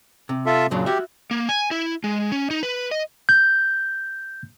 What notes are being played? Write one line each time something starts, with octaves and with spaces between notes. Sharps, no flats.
C3
F4 A4 E5
F#2 A#2 C#3 F#3 D4
F#4 G4 E5
A#3
G#5
E4
G#3
C#4
D#4
B4
D#5
G6